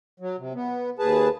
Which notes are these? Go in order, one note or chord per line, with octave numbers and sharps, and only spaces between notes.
F#3
C3
B3
D#2 G#4 B4 A5